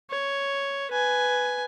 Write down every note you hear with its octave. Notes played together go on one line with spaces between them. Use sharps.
C#5
B4 G#5